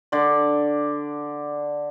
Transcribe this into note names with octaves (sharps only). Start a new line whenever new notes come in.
D3 D5